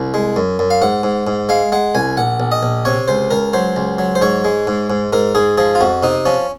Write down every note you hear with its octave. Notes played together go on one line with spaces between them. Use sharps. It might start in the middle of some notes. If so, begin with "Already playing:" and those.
Already playing: C2
G#3
F#2
F#2
F5
G#2 F#5
G#2
G#2
G#3 F5
G#3 F#5
C2 G#5
A#1 F#5
A#1
D#5
A#1
C3 C#5
C#2 C5
C#2 A#4
F#3 C5
C#2
F#3
C5
G#2 C#5
G#3
G#2
G#2
G#2 A#4
G#2 G#4
F3 G#4
F4
F2 F#4
C3 D#4
F3 C#4